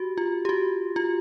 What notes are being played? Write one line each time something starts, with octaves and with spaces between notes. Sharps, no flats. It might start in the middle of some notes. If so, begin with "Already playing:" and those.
Already playing: F#4 G4
F4
G4
F#4
F4